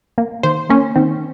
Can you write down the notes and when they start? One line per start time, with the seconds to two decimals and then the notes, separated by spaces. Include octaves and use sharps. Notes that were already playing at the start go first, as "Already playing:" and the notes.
0.18 A#3
0.43 D#3 C5
0.69 A#3 C#4
0.96 D#3 C4